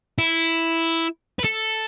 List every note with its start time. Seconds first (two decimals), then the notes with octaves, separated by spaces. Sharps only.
0.18 E4
1.39 B4
1.44 A4